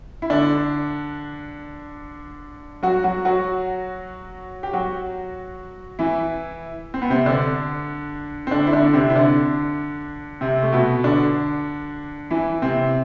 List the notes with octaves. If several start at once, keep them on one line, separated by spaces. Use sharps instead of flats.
E4
D3 D4
F#3 F#4
F#3 F#4
F#3 F#4
G4
F#3 F#4
E3 E4
C4
B3
C3 C4
D3 D4
C4
D3 D4
E4
D3 D4
C3 C4
E4
D3 D4
C3 C4
A3
B2 B3
D3 D4
E3 E4
C3 C4